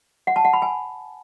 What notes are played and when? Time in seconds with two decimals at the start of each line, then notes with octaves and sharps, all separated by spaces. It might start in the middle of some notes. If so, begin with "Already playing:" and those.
0.27 F#5
0.36 A5
0.45 F#5
0.53 B5
0.62 G#5